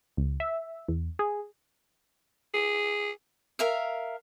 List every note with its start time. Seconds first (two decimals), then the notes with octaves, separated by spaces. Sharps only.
0.17 C#2
0.40 E5
0.89 E2
1.19 G#4
2.54 G#4
3.59 A#4 E5 F5